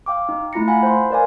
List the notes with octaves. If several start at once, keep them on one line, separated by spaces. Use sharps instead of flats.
F5 G5 D6
D#4
A3 E4 F4 A#5 A#6 C#7
F5 F#5 G#5 B5
C5 C6
A#4 B4 D5 F5 G#5